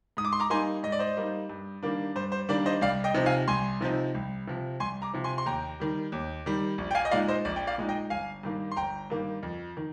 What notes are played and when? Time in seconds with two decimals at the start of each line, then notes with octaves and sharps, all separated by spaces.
0.17 G#2 D#6
0.25 D6
0.33 C6
0.40 A#5 D6
0.50 G3 A#3 D#4 G#5 C6
0.83 G#2 D#5
0.92 D5
0.99 C5 D#5
1.17 G3 A#3 D#4
1.50 G2
1.83 D#3 G3 A#3 D4
2.16 G2 C5
2.32 C5
2.49 D#3 G3 A#3 D4 D5
2.66 C5 D#5
2.81 C2 D5 F5
3.04 D#5 G5
3.14 C3 F3 C4 D#4
3.26 F5 G#5
3.48 C2 G#5 C6
3.81 C3 F3 C4 D#4
4.15 C2
4.47 C3 F3
4.80 C2 G#5 C6
5.02 A#5 D6
5.13 C3 F3
5.24 G#5 C6
5.38 C6
5.46 D#2 G5 A#5
5.80 D#3 G3
6.12 D#2
6.46 D#3 G3
6.78 A#1
6.91 G5
6.95 F5 G#5
7.05 D#5
7.11 A#2 G#3 D#4 D5 F5
7.28 C5 D#5
7.45 A#1 D5
7.56 G5
7.67 D5 F5
7.78 A#2 G#3 D#4
7.89 D#5 G5
8.10 G1 F5 G#5
8.43 G2 D#3 A#3
8.72 C6
8.76 G1 G5 A#5
9.10 G2 D#3 A#3
9.43 F2
9.77 D#3